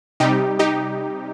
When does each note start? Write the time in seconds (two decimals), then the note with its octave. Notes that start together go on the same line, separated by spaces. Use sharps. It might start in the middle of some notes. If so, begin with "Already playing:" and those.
0.20 C3 G3 D#4 G4
0.59 D#4 G4